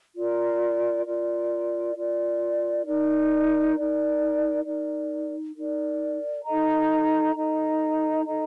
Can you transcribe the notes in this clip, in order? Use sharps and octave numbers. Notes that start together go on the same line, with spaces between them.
F4 A#4 D5
F4 A#4 D5
F4 A#4 D5
D#4 A#4 D5
D#4 A#4 D5
D#4 A#4 D5
D#4 A#4 D5
D#4 A4 D#5 A#5
D#4 A4 D#5 A#5
D#4 A4 D#5 A#5